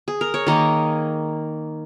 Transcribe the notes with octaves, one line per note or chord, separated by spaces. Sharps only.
G#4
A#4
C#5
D#3 A#3 D#5